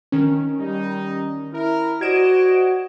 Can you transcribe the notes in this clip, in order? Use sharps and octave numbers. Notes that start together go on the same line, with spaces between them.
D#3 C#4
G3 D#4
E4 A#4
F#4 C5 D5 D#5 G#6 D7 E7